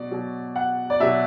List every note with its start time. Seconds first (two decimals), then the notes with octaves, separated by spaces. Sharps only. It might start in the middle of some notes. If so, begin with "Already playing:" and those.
Already playing: B2 F#3 D5
0.11 B2 F#3
0.56 F#5
0.90 D5
1.00 B2 F#3 E5